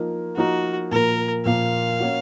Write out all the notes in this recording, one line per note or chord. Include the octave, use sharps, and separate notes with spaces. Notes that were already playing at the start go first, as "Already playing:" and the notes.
Already playing: F3 A#3 D#4 A#4
F3 A#3 D#4 F#4 A#4
A#2 F3 A#3 A#4
A#2 F3 A#3 F5
A#3 C#4 F#4